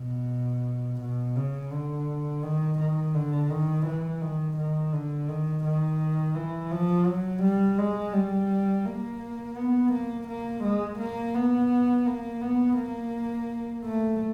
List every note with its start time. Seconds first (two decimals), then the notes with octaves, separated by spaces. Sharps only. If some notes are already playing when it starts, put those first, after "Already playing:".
Already playing: B2
1.01 B2
1.36 C#3
1.72 D3
2.43 D#3
2.79 D#3
3.15 D3
3.50 D#3
3.86 E3
4.22 D#3
4.58 D#3
4.93 D3
5.29 D#3
5.64 D#3
6.35 E3
6.71 F3
7.07 F#3
7.43 G3
7.78 G#3
8.14 G3
8.86 A#3
9.57 B3
9.92 A#3
10.28 A#3
10.63 G#3
10.99 A#3
11.35 B3
12.06 A#3
12.42 B3
12.77 A#3
13.85 A3